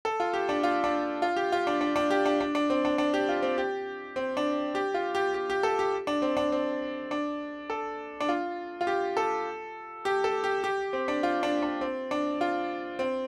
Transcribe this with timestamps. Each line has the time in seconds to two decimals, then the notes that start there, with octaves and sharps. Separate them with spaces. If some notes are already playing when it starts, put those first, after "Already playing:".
0.05 A4
0.20 F4
0.33 G4
0.49 D4
0.63 F4
0.84 D4
1.22 F4
1.36 G4
1.52 F4
1.67 D4
1.81 D4
1.96 D4
2.10 G4
2.26 D4
2.41 D4
2.55 D4
2.70 C4
2.85 D4
2.98 D4
3.14 G4
3.29 F4
3.42 C4
3.58 G4
4.16 C4
4.37 D4
4.75 G4
4.94 F4
5.15 G4
5.34 G4
5.50 G4
5.63 A4
5.79 G4
6.07 D4
6.22 C4
6.37 D4
6.52 C4
7.11 D4
7.70 A4
8.20 D4
8.29 F4
8.81 F4
8.87 G4
9.17 A4
10.05 G4
10.24 A4
10.44 G4
10.64 G4
10.93 C4
11.08 D4
11.23 F4
11.43 D4
11.63 D4
11.81 C4
12.11 D4
12.41 F4
12.99 C4